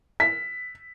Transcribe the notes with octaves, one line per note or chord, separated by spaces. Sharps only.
B6